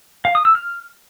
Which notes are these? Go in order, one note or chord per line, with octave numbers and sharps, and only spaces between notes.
F5
D#6
E6
F6